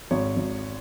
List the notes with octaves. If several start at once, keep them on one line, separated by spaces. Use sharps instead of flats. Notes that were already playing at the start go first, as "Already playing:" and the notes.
G#1 C#5
G#1